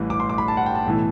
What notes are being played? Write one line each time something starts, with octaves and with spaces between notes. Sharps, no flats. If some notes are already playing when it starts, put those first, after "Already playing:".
Already playing: A1 A2 E3 G3
D6
C6
D6
B5
A5
F#5
G5
A5
B1 A2 E3